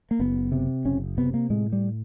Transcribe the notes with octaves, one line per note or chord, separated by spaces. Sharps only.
A#3
F#1 B3
C3
F#1 C#4
C3 B3
A#3
A2 G#3
G3